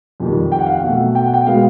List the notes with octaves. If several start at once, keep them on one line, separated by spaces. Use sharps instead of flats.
F2 C3 D#3 G3
G5
F#5
F5
F#5
B2 F#3 A3
G5
F#5
G5
B2 G#3 B3 F5